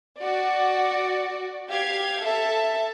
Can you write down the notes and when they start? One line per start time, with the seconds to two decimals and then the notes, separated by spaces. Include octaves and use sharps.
0.18 F#4 D5
1.69 G4 F5 G#6
2.23 A4 E5 A5